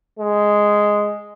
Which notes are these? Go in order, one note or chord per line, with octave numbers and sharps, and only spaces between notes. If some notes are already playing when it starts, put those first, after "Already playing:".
G#3